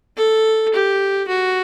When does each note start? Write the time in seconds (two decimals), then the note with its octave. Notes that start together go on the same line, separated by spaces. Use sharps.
0.17 A4
0.74 G4
1.28 F#4